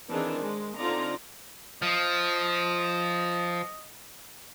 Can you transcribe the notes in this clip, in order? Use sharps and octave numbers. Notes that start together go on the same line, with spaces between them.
D#3 E3 C4 D4 D#4 G#4
G#3
D3 C4 D#4 F4 D5 A#5
F3 D#5